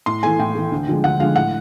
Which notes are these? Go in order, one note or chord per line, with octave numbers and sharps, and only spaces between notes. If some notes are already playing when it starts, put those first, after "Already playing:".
A2 C6
E3 A3 G#5
A2 G5
E3 A3
D2
D3 F3 G#3
D2 F#5
D3 F3 G#3 F5
A2 F#5